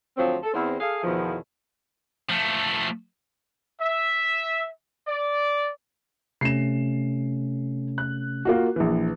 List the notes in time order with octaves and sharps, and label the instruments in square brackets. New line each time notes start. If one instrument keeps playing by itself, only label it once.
[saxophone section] D2 F3 F#3 C4
A4
E2 C4
G#4 A4 F5
E2 B2 D#3 F3
[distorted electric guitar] F3 A3
[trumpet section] E5
D5
[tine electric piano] C3 A3 C#4 [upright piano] C7 E7
[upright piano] F#6
A#3 F4 F#4
A#1 E3